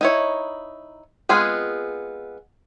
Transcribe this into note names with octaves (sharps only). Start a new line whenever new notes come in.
D#4 E4 C#5
G#3 B3 C4 F4 G#4